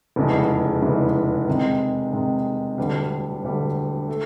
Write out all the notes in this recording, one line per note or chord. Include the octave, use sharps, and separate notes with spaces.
F1 E2 C#3 E3 G#3
F1 E2 C#3 E3 G#3
C3 D#3 G#3
C3 D#3 G#3
E1 D2 D3 G3
E1 D2 D3 G3
A3